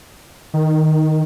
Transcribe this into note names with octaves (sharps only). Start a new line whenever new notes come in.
D#3